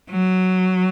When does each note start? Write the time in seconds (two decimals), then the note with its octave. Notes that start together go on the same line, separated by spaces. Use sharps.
0.10 F#3